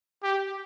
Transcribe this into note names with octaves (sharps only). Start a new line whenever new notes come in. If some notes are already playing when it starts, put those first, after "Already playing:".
G4